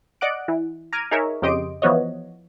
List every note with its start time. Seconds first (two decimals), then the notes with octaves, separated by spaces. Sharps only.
0.21 D5 D#5 F#5 D6 F#6 D7
0.48 E3
0.93 A#5 D6 F6 G#6 D#7
1.11 D#4 G#4 A#4 C#5 E5
1.42 F2 C#3 G4 D#5 C6 D7
1.82 E3 F3 B3 F#4 C#5 D#5